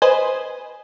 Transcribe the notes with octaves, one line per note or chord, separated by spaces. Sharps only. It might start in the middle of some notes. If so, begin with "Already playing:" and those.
B4 C5 D#5 G#5